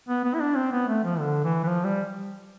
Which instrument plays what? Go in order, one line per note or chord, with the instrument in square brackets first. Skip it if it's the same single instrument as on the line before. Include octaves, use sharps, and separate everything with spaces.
[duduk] B3
B3
E4
D4
C4
B3
A3
F3
D3
E3
E3
F3
G3